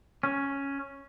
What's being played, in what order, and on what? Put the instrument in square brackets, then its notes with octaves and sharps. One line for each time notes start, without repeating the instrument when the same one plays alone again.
[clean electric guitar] C#4